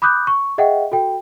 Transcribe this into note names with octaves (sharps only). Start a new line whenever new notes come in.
B5 D6 D#6 F#6 G6
C#6
G#4 D#5 E5 F#5 G5
F#4 A4 G5